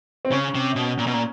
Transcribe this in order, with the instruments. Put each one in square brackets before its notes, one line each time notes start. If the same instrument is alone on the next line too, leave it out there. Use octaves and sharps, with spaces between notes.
[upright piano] C4
[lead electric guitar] C#3 [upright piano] C#4
[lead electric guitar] C3
B2
A#2
B2
A#2